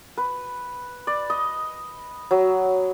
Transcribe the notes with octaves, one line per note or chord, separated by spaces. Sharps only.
B4
D5
D#5
F#3